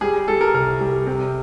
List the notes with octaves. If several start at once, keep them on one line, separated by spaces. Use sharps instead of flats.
G3 G#4
G3 A4
A#4
C2 A#4
G3
C3